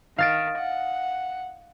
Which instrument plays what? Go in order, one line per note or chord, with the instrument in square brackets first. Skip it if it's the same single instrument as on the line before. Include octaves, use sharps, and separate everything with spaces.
[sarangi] D#3 [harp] F5 A6 D7
[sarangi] F#5